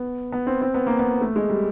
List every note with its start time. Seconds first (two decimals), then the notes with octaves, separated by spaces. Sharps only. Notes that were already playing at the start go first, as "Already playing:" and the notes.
Already playing: B3
0.32 B3
0.47 C4
0.62 C4
0.74 B3
0.87 A#3
0.99 B3
1.21 A3
1.36 G#3
1.50 G3